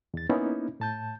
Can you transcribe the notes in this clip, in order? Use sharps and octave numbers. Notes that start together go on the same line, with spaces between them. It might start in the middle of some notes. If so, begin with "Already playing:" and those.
E2 A6
A#3 B3 C#4 D#4 E4
A2 A5 G6